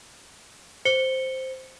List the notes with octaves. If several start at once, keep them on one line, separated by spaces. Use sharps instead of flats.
C5 C#7 G7